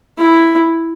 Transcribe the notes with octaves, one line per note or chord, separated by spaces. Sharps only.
E4